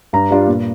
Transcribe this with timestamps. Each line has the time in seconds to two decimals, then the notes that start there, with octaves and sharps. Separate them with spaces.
0.13 G2 A#5
0.30 G3 D4 F4
0.47 A#2